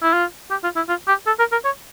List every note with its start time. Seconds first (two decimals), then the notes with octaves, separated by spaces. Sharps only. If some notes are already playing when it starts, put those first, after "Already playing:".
0.03 E4
0.13 F4
0.51 G4
0.64 F4
0.76 E4
0.88 F4
1.08 G4
1.27 A4
1.39 A#4
1.52 A#4
1.65 C#5